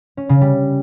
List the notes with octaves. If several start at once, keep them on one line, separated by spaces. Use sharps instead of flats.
C#4
C#3
G3